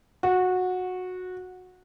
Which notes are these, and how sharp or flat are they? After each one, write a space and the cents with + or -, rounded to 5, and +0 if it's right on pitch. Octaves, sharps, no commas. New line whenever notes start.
F#4 -15